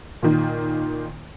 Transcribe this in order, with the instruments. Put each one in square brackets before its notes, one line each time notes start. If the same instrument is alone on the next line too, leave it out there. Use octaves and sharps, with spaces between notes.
[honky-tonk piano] A#2 D#3